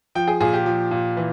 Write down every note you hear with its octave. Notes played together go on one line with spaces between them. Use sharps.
F3 G5
G#4
A#2 G#4
G4
F3
A#2
E3